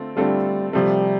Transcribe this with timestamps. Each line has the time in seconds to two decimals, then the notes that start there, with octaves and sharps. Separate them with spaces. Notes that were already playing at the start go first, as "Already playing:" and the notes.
Already playing: D3 A3 C4 F4 A4
0.17 D3 G3 A3 C4 F4 A4
0.73 C3 F3 G3 A3